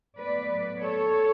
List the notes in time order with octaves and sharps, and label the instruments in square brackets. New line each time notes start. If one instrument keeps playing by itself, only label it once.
[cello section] A2 F#3 B3 B4 D5
A4 C#5